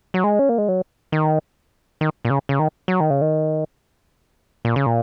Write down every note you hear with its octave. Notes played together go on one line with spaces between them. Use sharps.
F#3
G#3
C#4
A#3
G#3
F#3
D#3
D#3
A#2
C#3
C#3
D#3
F#3
D#3
C#3
D#3
A#2
C#3
A#2